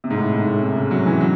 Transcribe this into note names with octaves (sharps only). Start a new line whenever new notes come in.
C3
G#2
A2
G#2
A2
C3
C#3
F#3
E3
F#3